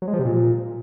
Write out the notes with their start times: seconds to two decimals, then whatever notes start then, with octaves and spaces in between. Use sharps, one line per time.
0.02 F#3
0.08 G#3
0.13 F3
0.19 C3
0.25 A#2